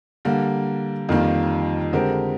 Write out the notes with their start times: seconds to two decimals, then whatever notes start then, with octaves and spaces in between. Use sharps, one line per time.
0.25 D3 G3 A#3
1.09 F2 D#3 G3 A#3 F4
1.93 D3 G#3 C4 G4 A#4